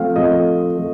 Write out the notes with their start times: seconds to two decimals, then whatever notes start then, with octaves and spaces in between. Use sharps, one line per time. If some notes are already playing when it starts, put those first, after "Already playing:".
Already playing: F3 A3 C4 F5
0.16 F3 A3 C4 D#5
0.77 F3 A3